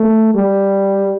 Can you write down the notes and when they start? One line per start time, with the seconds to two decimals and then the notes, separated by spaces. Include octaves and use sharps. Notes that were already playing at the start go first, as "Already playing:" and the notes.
Already playing: A3
0.34 G3